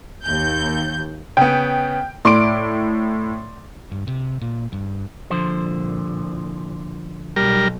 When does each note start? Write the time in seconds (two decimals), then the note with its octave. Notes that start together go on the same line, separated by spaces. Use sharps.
0.25 D#2 G6
1.37 C#3 B3 G5
2.25 A2 D5 C6 D6 D7
3.92 G2
4.07 C3
4.41 A#2
4.73 G2
5.30 C2 A#2 D3 F3 C5
7.36 B1 G3 A#4